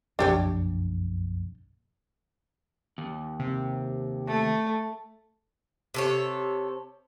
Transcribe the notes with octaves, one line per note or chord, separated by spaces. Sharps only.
F#1 B1 F2 D4 G4 C#5
D#2
C3
A3
C3 A4 C#5